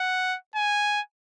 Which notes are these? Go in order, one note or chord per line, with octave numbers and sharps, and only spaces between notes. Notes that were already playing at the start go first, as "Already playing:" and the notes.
Already playing: F#5
G#5